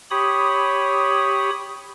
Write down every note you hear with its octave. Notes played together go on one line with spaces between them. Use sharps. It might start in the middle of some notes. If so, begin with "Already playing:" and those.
G4 C#5 B5 D#6